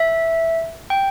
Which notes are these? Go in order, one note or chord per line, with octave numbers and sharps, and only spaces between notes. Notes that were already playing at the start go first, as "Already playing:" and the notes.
Already playing: E5
G5